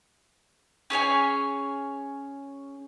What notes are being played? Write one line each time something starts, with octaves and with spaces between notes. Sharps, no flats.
C#4 G#4 C#5 G#5